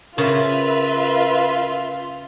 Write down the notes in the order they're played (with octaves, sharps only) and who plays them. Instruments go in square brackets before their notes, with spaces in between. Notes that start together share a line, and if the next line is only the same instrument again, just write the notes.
[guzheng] C#3 [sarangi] F4 [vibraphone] A#4 [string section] B4 E5